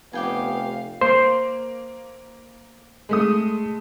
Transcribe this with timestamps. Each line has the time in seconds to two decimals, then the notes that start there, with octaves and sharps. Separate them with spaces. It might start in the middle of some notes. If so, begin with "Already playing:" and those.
0.13 F1 B3 G4 F5 G5 G#5
1.01 A#3 C5
3.09 G#3 A3 D#6